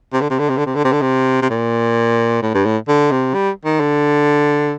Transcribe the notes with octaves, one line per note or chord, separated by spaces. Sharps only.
C3
D3
C3
D3
C3
D3
C3
D3
C3
D3
C3
C3
A#2
A2
G2
A2
D3
C3
G3
D#3
D3